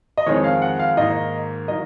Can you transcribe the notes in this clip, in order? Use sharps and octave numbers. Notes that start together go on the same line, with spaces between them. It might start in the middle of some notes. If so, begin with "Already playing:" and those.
D#5
F2 D#3 G#3 C4 C#5
F5
F#5
F5
G#2 D#3 A#3 D#5
D#3 F#3 A#3 D#5